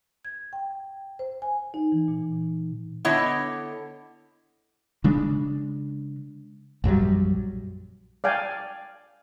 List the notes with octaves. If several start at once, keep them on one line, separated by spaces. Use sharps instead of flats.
G#6
G5
C5
G#5
D#4
E3
A#2
D3 B3 E4 C#5 D#5
C#3 G#3 D4
A#1 F#2 F#3 G3
D5 F5 G5 G#5